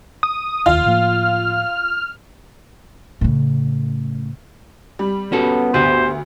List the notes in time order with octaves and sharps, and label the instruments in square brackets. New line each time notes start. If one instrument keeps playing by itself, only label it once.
[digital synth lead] D#6
[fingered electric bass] F1 D#2 [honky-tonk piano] F4 [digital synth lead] F6
[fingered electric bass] A2 F3 A#3
[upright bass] A2 C#3
[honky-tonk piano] G3
[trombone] B3 [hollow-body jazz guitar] C#4 F#4 A4
[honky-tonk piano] D2 [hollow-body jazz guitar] G4 B4 [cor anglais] C5